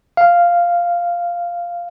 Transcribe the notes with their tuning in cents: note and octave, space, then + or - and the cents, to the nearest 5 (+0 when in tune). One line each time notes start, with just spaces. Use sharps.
F5 -5